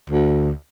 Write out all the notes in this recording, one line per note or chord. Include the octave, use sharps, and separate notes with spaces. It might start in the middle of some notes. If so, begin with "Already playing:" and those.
D2